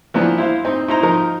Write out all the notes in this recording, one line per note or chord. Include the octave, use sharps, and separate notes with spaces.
E3 F3 A#3 B3 D4
E4 C5 F5
C4 D#4
D#4 E4 C5 A#5
F3 D#4 A#4